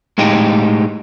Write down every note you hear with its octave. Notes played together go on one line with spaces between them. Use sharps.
A2 G#3 D#4 G4